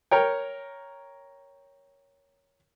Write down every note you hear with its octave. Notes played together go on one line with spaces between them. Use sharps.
A#4 C#5 G5